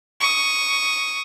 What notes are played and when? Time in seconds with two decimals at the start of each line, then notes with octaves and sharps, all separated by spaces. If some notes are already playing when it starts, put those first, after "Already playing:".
0.21 C#6 D#6